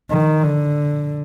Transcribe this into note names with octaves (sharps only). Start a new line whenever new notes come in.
D#3
D3